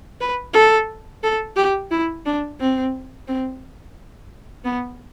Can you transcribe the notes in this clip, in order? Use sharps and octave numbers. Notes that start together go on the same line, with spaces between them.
B4
A4
A4
G4
E4
D4
C4
C4
B3